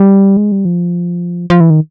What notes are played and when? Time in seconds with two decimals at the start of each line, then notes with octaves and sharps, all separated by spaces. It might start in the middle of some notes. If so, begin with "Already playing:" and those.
Already playing: G3
0.37 G#3
0.52 G3
0.65 F3
1.50 F3
1.60 E3
1.70 D#3